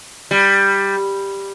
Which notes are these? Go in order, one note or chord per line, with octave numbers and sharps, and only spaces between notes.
G3